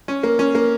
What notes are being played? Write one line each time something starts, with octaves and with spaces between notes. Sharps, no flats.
C#4
A#3
C#4
A#3